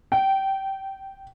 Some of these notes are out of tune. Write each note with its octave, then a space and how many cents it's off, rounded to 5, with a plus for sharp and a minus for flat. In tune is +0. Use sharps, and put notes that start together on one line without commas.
G5 -20